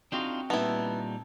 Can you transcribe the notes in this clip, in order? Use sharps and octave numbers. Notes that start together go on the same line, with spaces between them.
C4 D4 D#4 F4 F#4 G#4
A#2 G3 B3 D#4 E4 A5